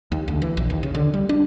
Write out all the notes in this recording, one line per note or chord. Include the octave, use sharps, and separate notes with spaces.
D#2
D2
E3
A#1
D#2
C#3
D3
G3
D4